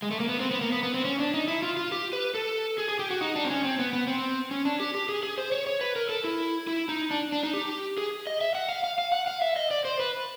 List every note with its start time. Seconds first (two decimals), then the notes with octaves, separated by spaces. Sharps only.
0.02 G#3
0.11 A3
0.20 A#3
0.29 B3
0.40 C4
0.51 B3
0.61 A#3
0.72 B3
0.83 B3
0.94 C4
1.05 C#4
1.19 D4
1.34 D#4
1.48 E4
1.62 F4
1.77 F4
1.92 G4
2.13 B4
2.35 A4
2.78 G#4
2.89 G#4
2.99 G4
3.10 F#4
3.21 D#4
3.35 D4
3.44 C4
3.50 C#4
3.64 C4
3.79 B3
3.93 B3
4.07 C4
4.51 C#4
4.65 D4
4.80 G4
4.95 G4
5.09 G#4
5.23 G#4
5.38 C5
5.52 C#5
5.67 C#5
5.81 B4
5.96 A#4
6.09 A4
6.24 E4
6.67 E4
6.89 D#4
7.11 D4
7.32 D4
7.43 D#4
7.53 G4
7.98 G#4
8.27 D#5
8.41 E5
8.55 F#5
8.69 F5
8.84 F5
8.98 F5
9.12 F#5
9.27 F5
9.42 E5
9.56 D#5
9.71 D5
9.85 C5
10.00 B4